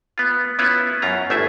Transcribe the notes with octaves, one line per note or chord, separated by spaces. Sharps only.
B3 F4
B3 C#4 E4 F4 B4
F#2 C#4 F4 A#5
G1 D2 A3 E4 G#4 E5